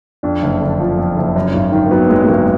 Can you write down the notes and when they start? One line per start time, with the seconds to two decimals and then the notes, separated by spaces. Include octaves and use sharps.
0.23 F2 D4
0.42 F#1
0.61 D3
0.80 F3
0.98 F2
1.17 F#1
1.36 F#2
1.54 G#1
1.72 D#3
1.86 A#3
1.91 F#3 B3
2.10 F#2 G#3
2.25 G#3
2.28 G#1 A#3